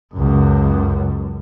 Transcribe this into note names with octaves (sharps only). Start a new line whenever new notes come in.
C#2 F#2